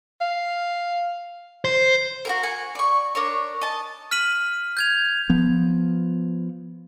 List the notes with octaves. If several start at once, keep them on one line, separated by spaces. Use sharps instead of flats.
F5
C5
F#4 G4 A#4
F#5 G#5
D5 C#6
D4 A#4 C#5
D#5 A5
F6 B6 D#7 F#7
G6 G#6 F7
F3 B3